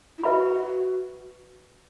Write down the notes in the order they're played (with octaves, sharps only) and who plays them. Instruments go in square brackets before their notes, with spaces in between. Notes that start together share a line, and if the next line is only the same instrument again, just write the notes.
[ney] E4
[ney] F#4 [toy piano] B4 E5 B5